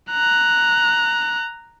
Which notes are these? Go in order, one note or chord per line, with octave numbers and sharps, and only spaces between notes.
A#5 F#6